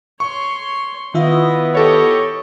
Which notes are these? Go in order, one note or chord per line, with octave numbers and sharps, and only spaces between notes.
C#5 C6 C#6
D#3 B3 E4 F4 D#5 E5
G4 A4 C#5 D#5 C#6